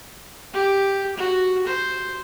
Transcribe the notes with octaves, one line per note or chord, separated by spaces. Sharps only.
G4
F#4
C5